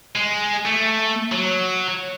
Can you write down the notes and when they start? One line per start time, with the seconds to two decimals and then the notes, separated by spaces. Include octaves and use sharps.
0.16 G#3
0.66 A3
1.32 F#3